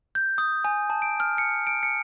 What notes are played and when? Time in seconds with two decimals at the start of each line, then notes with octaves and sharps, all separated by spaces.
0.15 G6
0.38 D#6
0.64 G#5
0.90 A5
1.02 D7
1.20 F6
1.38 C#7
1.67 D7
1.83 C#7